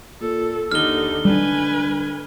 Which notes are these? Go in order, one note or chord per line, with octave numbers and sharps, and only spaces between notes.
A#2 A4
D#2 D3 D#4 F6 G7
D3 G3 D4 B4 G#5